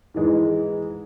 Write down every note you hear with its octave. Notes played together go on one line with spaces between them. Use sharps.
G#2 E3 G#3